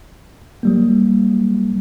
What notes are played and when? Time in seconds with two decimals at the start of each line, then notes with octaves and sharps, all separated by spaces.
0.63 F#3 G3 A#3